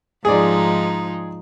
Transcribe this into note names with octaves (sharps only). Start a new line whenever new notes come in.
G#2 F3 D#4 G#4 D5